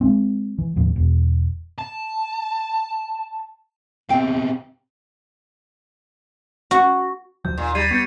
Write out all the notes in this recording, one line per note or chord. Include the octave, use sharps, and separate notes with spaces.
G#3 B3 C4
E3
D#2 A2 F3
E1
A5
B2 C4 F5 G5
F#4
D2 F3 F#3 G6
D#2 A#2
G3 G#6 C7 D#7
B3 C#6 C#7 D#7